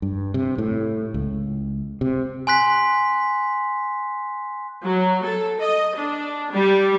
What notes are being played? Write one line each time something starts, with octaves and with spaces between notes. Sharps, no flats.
G2
C3
A2
C#2
C3
G#5 C6 F#6 B6
F#3
A4
D#5
D4
G3